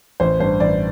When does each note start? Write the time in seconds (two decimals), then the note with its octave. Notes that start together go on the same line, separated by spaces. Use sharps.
0.20 A1 C5
0.40 G2 C5
0.60 A1 D5